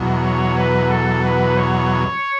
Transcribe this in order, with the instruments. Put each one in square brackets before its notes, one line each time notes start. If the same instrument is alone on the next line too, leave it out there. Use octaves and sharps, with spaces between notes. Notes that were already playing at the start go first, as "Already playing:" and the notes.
Already playing: [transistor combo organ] E2 B2 F#3
[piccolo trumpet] C#5
B4
A4
B4
C#5